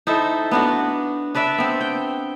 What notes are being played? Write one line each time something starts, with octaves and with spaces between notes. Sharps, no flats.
D#4 E4 A4 C5
B3 D4 F#4
D4 B4 D5 E5
B3 C4
G5